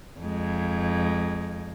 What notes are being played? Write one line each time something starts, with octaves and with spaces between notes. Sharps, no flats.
F2 G#3